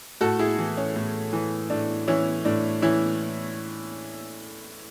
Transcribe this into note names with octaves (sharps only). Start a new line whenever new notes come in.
A2 F#4 A4
E4 G#4
E3
C#4
A2
E3
A2 D4
E3 C#4 E4
A2 D4
E3 C#4 E4